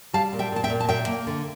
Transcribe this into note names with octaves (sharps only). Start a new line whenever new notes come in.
G3 F5 A5
A#2
E5 G5
A#2 A5
E5 G5
A#2
A5
A#3 E5 G5
A#3
D3